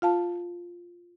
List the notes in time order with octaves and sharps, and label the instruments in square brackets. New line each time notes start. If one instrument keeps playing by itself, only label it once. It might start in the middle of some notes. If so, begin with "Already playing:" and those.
[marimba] F4 F5 A5